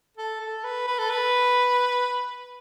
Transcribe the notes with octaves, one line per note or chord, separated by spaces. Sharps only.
A4
A4
B4
B4
A4
B4